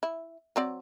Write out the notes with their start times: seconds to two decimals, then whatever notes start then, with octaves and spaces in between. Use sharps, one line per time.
0.03 E4
0.56 F#3 C4 D5